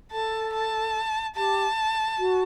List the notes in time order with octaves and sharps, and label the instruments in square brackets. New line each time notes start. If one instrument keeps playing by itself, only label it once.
[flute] A4 [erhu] A5
[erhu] A5
[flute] G4 [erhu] A5
[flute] F#4